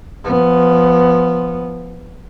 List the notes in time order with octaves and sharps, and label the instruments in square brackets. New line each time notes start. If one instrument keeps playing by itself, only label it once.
[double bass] F3 B3